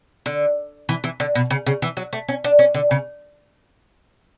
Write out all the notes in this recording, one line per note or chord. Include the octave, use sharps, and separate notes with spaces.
D3
E3
E3
D3
B2
C#3
C#3
E3
F#3
A3
C#4
D4
C#4
D3
C#3